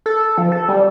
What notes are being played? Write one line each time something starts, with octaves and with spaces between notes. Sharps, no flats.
A4
F3
A4
G3